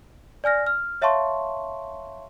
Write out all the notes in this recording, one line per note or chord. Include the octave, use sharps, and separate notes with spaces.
D5 G#5 F6 A#6
F6
C#5 E5 F5 A5 C6 C#6